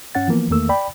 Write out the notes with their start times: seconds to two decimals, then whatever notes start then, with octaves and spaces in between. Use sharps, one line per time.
0.15 G2 C#4 F#5 A6
0.28 E3 F3 A#3 B3
0.50 E2 D#3 A3 A#3 E6
0.69 D5 G5 B5